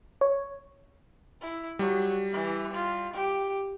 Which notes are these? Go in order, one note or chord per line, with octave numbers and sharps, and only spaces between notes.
C#5
E4
F#3 G3
E3
F4
G4